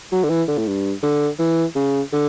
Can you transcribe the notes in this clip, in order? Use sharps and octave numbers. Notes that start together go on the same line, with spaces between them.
F#3
D3
E3
D3
A2
G2
D3
E3
C#3
D3